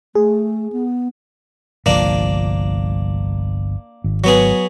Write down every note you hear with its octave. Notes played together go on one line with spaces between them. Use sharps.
A3 G#4
B3
G1 C2 F3 A#3 D4
G#1
F#3 B3 G#4